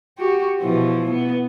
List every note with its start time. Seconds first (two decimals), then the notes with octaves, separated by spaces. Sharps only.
0.18 F#4 G4
0.60 B2 E3 F3
1.10 B3